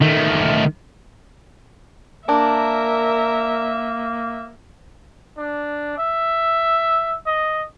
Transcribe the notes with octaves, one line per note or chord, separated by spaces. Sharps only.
D#3 A3
A#3 D4 A#4 E5
D4
E5
D#5